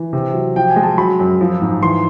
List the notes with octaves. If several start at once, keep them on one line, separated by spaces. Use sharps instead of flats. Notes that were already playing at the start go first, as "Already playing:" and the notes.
Already playing: E3
C3
F#3
F3 G5
G#5
G#3
A5
F#3 B5
F#2
F3
G#2
E3 C6